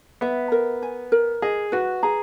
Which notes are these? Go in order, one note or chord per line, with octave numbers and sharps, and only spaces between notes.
B3 E5
A#4
G#5
A#4
G#4 D#5
F#4 B4
G#4 A#5